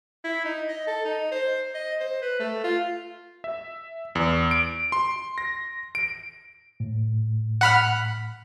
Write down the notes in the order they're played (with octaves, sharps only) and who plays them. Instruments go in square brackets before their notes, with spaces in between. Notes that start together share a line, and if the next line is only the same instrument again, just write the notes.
[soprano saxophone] E4
D#4
D#5
A4
D#4
C5
D#5
C5
B4
A3
F4
[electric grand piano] E5
E2
D7
C6
A#6
D7
[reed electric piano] A2
[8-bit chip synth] F#5 B5 F6